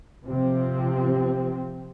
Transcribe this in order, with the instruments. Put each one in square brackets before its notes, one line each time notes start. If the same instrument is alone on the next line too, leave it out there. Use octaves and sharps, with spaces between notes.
[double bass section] C3 F3 C4